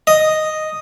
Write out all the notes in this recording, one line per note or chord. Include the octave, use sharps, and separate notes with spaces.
D#5